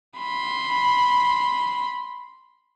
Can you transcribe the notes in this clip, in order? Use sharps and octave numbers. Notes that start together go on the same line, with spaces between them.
B5 C6